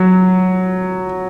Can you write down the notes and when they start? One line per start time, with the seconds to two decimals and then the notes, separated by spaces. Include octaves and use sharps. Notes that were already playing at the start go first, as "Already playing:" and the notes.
Already playing: F#3